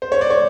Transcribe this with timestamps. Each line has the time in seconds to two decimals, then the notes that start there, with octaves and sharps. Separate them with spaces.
0.02 C5
0.12 C#5
0.21 D5
0.30 C#5